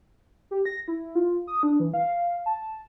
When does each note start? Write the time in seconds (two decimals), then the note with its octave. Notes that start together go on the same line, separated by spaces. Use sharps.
0.51 G4
0.65 A#6
0.88 E4
1.15 F4
1.48 D#6
1.63 D4
1.80 E3
1.94 F5
2.46 A5